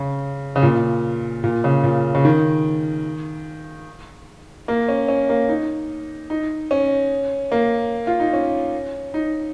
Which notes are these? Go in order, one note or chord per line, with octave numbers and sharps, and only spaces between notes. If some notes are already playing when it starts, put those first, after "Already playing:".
Already playing: C#3
C#3
A#2
A#2
C#3
A#2
C#3
D#3
A#3
C#4
C#4
A#3
D#4
D#4
C#4
A#3
F4
D#4
C#4
D#4